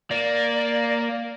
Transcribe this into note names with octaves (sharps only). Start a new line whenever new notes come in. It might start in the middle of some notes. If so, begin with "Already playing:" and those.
A#3 D5